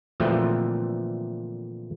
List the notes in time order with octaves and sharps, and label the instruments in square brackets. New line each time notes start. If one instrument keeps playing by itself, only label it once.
[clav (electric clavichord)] A#2 D3 E3 F3 A3 C4